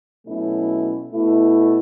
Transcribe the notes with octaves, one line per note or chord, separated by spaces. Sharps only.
B2 F#3 A3 C#4 E4
B2 A3 E4